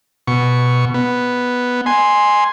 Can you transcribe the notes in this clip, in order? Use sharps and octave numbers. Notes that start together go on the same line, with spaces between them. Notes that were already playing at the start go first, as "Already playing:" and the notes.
B2 C#6
B3
G#5 C6